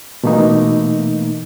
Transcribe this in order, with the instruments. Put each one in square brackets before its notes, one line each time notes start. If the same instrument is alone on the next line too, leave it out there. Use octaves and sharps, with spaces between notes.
[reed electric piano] B2 E3 A3 A#3 D#4